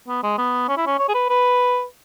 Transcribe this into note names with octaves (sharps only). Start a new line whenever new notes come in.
B3
G#3
B3
C#4
E4
C#4
C#5
G#4
B4
B4